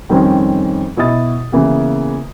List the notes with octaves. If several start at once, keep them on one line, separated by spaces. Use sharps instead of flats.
F2 D#3 G3 C4 C#4
B2 E4 D#5 D#6 A6
C#3 E3 A#3 B3